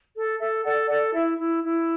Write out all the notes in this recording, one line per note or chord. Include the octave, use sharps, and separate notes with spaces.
A4
A4 E5
A4 D5 F#5
A4 D5 F#5
E4 E5
E4
E4